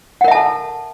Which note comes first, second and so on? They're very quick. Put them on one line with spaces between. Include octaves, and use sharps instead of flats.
F#5 A#4 E5 A5 A4